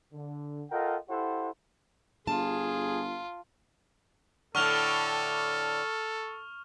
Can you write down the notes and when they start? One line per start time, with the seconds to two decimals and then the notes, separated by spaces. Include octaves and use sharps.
0.13 D3
0.71 F4 A4 A#4 D#5 F#5 G5
1.09 E4 G4 A4 C5 F#5
2.27 G1 F4 G#4 A5
4.55 A2 D3 A4 C#6 F6 F7